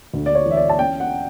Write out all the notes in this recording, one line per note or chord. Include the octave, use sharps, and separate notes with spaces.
D2
D5
C#5
E3
E5
D5
A5
C#4 G5
F#5